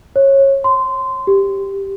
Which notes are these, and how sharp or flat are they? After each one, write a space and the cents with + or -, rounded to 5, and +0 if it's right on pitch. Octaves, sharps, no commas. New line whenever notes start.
C#5 -25
C6 -15
G4 +5